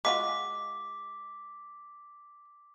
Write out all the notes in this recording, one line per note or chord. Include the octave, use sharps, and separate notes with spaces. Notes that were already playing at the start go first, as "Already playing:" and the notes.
G#3 F4 F#4 D6 B6